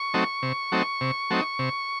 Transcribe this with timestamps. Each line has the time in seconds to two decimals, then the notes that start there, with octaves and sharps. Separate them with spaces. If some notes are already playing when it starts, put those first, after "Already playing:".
Already playing: C#6
0.14 F#3 A3 C4 D#4
0.42 C3
0.72 F#3 A3 C4 D#4
1.01 C3
1.31 F#3 A3 C4 D#4
1.59 C3